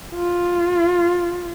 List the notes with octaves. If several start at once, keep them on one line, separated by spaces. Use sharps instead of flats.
F4